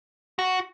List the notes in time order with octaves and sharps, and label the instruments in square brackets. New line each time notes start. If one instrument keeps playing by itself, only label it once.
[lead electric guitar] F#4